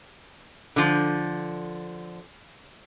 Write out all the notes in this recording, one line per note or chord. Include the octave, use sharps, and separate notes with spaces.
D3 F3